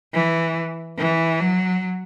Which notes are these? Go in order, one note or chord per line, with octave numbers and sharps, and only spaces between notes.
E3
E3
F#3